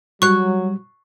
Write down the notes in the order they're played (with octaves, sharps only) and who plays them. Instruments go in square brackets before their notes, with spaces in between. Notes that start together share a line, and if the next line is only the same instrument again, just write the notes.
[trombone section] F#3 [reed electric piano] G3 [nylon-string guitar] F#4 C#5 [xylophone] C#6 F#6